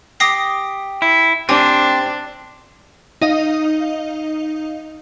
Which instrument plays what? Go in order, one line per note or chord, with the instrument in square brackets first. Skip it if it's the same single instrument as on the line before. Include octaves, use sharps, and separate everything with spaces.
[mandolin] G4 [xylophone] D#6 A#6 C7
[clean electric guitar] E4
[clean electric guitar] C4 [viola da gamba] D4 [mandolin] G4 [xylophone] G#5
[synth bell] D#4 D#5 F5